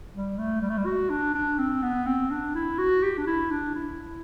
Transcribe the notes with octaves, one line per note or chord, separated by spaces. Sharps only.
G3
A3
G3
A3
G3
F#4
D4
D4
C4
B3
C4
D4
E4
F#4
G4
D4
E4
D4
E4